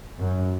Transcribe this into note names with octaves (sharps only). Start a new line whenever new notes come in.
F#2